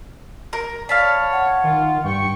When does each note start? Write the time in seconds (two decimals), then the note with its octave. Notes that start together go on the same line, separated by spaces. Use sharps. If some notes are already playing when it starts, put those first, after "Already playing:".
0.53 A#4
0.89 C#5 D5 F5 A5 B5
1.32 F#5
1.64 D#3 F4
2.04 G2 G5 C#6